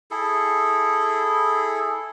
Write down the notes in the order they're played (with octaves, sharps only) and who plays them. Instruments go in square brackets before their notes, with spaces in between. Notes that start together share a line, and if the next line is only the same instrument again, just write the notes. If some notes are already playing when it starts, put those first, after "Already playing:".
[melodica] E4 G#4 A4